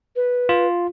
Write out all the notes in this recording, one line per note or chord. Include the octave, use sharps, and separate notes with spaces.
B4
F4